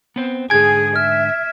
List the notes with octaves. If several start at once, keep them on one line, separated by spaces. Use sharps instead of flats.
B3 C4 C5
G#2 D3 G#4 G#5 G#6 D7
E5 F6